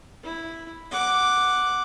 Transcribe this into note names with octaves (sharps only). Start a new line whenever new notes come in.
E4
F#5 D6